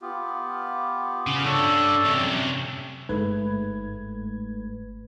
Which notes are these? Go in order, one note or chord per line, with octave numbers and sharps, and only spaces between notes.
B3 F4 G4
C#3
G2 A4 C#5 D5
F#2 C3
G1 G#2 A3 B4 G#6